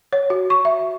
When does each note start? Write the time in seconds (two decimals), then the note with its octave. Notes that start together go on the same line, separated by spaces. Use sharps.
0.13 C#5
0.30 F#4
0.50 C#6
0.65 E5